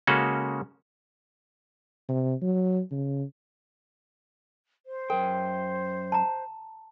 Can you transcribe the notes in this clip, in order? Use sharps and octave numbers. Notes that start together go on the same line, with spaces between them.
C#3 G#3 A#3 C#4 F#4 A4
C3
F#3
C#3
C5
F#2 A#4 G5
A5 A#5